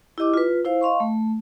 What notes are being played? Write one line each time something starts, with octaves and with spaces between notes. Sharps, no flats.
E4 G4 D#5 D6
F4 B4
E4 C5 F5
D#5 F5 C6 C#6
A3